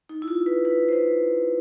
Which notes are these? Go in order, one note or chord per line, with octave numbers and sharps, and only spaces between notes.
D#4
E4
F4
B4
B4
C5
B4